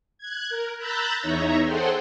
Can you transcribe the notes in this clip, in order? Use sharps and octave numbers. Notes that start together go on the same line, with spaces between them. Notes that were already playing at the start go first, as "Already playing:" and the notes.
F#6 G#6
A#4
A#5 B5 E6 F#6 G6 A6
E2 D#4 C#5 E5 A#5
G#4 A4 C5 F#5 G5 C6